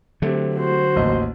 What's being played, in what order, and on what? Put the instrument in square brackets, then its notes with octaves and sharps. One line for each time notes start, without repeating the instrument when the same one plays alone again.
[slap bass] D3 F#3 [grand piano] A3 C4 G4
[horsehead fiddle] F#4 C5
[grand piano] A1 D#2 D#5